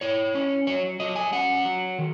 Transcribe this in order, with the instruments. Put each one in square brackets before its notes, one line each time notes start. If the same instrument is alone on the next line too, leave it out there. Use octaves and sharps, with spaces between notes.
[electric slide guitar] E4 C#5
C#4
F#3 C#5
F#3 D#5
G#5
C#4 F#5
F#3
D#3